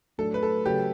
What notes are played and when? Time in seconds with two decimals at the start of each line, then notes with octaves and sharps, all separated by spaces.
0.18 A2 F#3 A3 D4 A4
0.34 B4
0.43 A4
0.66 C#3 F#3 A3 G4